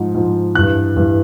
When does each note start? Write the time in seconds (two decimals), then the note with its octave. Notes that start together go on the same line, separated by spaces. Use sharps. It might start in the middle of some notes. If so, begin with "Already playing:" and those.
Already playing: G#2 F3
0.14 G#2 F3
0.55 G2 E3 F#6
0.97 G2 E3